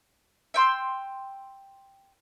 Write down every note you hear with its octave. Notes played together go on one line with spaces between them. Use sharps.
E5 G5 C6 E6